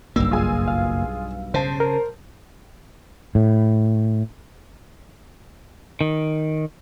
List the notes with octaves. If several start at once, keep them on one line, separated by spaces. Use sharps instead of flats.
F#1 B1 G2 A#3 E6
F4 G#4 G#5
F5
C#3 C5 A5
A#4
A2
D#3